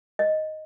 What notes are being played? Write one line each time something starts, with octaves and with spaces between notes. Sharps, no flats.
D#5